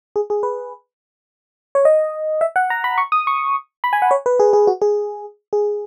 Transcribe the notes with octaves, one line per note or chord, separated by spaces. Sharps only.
G#4
G#4
B4
C#5
D#5
E5
F#5
A#5
B5
C#6
D#6
C#6
B5
G#5
F#5
C#5
B4
G#4
G#4
F#4
G#4
G#4